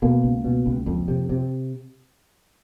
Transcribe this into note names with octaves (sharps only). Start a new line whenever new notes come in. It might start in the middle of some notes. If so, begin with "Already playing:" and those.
B2 A#3
C#2
B2
C#2
F2
C3
C3